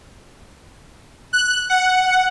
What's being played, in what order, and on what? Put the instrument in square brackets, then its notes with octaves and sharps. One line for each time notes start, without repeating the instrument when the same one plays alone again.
[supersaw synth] F#6
F#5